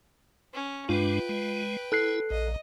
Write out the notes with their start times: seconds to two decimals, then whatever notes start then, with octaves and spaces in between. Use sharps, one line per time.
0.53 C#4
0.89 G2 G#3 D4 F4 B4 G5
1.29 G#3
1.92 E4 A4 F#6 C7
2.30 A#1 D#5